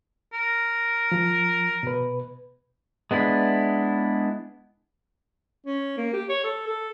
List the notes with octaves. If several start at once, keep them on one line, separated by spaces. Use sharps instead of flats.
A#4
F3
B2 B4
G#3 B3 D4 E4
C#4
A#3
G4
C#5
A4
A4